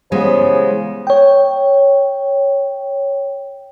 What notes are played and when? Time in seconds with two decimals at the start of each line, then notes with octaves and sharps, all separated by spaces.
0.12 C#3 E3 G3 G#3 B3 C5
1.07 C#5 G5